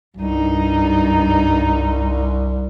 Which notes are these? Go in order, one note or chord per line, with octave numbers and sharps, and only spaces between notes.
C2 G2 D#4